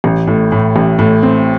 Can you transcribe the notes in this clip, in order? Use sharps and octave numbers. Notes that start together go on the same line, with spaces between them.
A1
A2
A2
A1
A2
C4